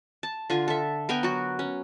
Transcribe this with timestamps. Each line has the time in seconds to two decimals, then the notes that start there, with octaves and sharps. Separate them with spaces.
0.23 A5
0.50 D3 F4 G#5
0.68 A4 E5
1.09 B3 A#4 G5 G#5
1.23 F#3 F#4
1.59 C#4